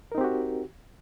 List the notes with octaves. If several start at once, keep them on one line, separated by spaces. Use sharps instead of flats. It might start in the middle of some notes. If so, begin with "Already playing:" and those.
C4 D#4 F#4 G4 A#4